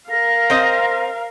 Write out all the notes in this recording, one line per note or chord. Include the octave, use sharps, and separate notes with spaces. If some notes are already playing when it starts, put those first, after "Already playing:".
A#4 F5 A#6
C4 C5 D#5